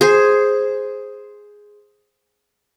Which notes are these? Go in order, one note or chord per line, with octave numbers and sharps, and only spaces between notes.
G#4 C5